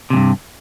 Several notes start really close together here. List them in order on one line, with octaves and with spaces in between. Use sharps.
C3 E2 G2